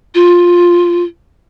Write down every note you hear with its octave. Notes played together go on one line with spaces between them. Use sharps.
F4